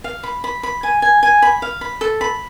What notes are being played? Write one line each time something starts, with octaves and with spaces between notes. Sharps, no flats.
F5
B5
B5
B5
G#5
G#5
G#5
B5
F5
B5
A4
B5